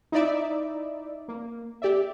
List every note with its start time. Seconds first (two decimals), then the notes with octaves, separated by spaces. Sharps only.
0.12 D#4 E4 D5 E5
1.28 A#3
1.82 G4 D5 E5